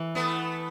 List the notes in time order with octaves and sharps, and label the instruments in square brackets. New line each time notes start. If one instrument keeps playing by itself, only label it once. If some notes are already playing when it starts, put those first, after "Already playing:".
Already playing: [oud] E3
[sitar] A3 B3